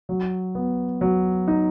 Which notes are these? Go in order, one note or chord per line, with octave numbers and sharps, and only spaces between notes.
F#3
B3
F#3
D#4